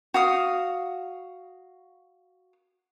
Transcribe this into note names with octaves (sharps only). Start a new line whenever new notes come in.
F#4 F5 D#6